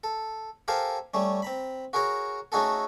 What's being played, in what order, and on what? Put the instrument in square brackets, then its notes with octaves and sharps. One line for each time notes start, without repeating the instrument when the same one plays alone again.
[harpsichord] A4
G4 A4 A#4 C5 F5 G#5
G3 A3 C#4
C4 A#5 B5
F#4 G#4 A#4 C#5 A#5
A3 C#4 D#4 F#4 G#4 A4